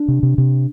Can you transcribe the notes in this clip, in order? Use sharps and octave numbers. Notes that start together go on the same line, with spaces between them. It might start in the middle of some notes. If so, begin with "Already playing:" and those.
Already playing: D4
C3
C3
C3